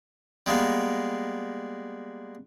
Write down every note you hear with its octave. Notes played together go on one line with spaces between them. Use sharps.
G3 G#3 A#3 B3